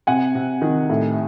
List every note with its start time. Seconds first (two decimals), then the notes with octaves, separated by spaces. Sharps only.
0.07 C3 F#5 G#5
0.35 C3
0.62 D#3
0.90 A2